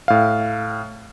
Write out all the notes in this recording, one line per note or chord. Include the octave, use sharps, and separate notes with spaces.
A2 F5